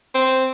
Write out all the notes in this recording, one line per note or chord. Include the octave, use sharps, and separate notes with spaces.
C4